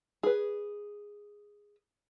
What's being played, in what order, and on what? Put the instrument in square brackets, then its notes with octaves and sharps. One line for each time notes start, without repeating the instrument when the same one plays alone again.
[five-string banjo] G#4 B4